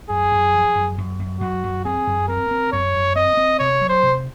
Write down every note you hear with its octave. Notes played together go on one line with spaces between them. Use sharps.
F#2 G#4
F#2
F3
F#2
F#2
F#2
F#2 F#4
F#2
C4 G#4
F#2
C4 A#4
C4
F#2 C#5
F#2
C4 D#5
C4
C3 C#5
F#3
C5
C3